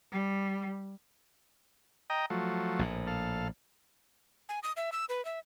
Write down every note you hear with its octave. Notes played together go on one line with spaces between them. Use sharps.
G3
D#5 G5 A#5
F3 F#3 A3
A#1 A2
A4 F5
G#5
D#6
E5
E6
B4
E5